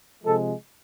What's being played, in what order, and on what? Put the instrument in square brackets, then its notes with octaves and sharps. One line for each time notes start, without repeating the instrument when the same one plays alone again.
[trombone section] C3 F3 G#3 A4